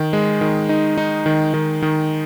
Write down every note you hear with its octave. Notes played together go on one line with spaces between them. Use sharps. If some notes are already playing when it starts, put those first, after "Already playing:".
Already playing: D#3
G#3
D#3
D#4
D#4
D#3
D#3
D#3